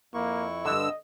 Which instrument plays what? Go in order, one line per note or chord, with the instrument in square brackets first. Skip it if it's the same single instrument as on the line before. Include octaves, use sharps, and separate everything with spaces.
[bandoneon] F2 E4 C#6 [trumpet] A#3
[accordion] G2 E6 [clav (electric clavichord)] D3 [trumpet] D#5